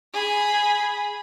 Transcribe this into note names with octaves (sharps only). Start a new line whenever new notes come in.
G#4 B5